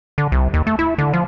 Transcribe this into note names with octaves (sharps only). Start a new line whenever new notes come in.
D3
C2
D#2
A3
E4
D3
F3